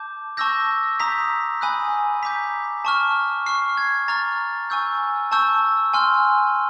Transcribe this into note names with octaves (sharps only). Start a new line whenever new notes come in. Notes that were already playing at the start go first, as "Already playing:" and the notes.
Already playing: A5 D6 G6
A5 C#6 E6 G6 A#6
A#5 D#6 G6 B6
G#5 B5 D#6 F#6
A#5 D6 G6 B6
A5 C#6 F6
C#6 F6 C7
G#6
A#5 C#6 F6 A6
G#5 C#6 E6 G6
A5 C#6 E6 G6
G#5 C6 F6